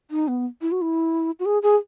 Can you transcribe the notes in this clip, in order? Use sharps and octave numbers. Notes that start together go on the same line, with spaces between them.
D#4
B3
E4
F#4
E4
F#4
G#4
G#4